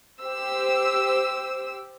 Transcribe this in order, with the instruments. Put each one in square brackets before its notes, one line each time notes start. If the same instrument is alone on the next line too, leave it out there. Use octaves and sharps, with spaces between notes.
[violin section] G4 C5 E6